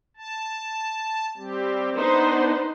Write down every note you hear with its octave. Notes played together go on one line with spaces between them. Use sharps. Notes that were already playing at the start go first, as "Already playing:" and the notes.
A5
G3 C4 G4
B3 D4 D#4 B4 C5